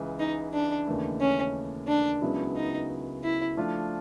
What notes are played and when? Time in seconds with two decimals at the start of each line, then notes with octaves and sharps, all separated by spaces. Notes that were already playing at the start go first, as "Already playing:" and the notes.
Already playing: C#2 C#3 E3
0.19 D#4
0.54 D4
0.87 D#2 C#3 E3 A3
1.20 C#4
1.88 D4
2.21 C#2 C#3 F#3 B3 E4
2.56 D#4
3.23 E4
3.57 F3 A3 D4 F4